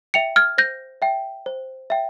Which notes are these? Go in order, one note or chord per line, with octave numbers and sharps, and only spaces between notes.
E5 G5 C#7 F7
F6 G#6
C5 G6 A#6
E5 G5
C5
E5 G5